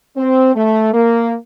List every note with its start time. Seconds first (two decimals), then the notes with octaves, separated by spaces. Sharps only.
0.17 C4
0.55 A3
0.94 A#3